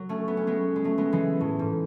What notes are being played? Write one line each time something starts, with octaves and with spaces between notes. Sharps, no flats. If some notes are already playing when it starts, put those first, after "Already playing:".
Already playing: F#3
A3 C#4
B3
C#4
G#3 B3
G#3
F#3 A3
G#3 B3
E3 G#3
A2
G#2